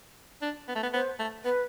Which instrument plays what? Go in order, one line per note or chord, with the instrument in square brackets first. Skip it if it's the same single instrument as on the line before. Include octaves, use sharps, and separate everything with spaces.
[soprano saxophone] D4
B3
A3
B3
[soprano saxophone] B3 [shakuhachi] C5
[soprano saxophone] A3
[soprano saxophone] B3 [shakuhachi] B4